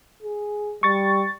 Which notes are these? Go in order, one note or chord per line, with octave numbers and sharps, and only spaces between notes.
G#4
G3 C#6 A6